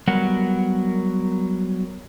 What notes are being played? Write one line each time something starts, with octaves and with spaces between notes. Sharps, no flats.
F#3 G3 B3 A#4 F#5